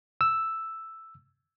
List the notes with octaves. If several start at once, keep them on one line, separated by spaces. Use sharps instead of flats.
E6